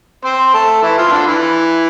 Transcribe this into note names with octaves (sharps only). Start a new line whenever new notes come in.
C4 C5
A3 A4
E3 E4
F3 F4
C4
D3 D4
E3 E4